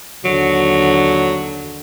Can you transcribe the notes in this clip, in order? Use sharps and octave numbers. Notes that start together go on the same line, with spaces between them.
D#2 D3 F#3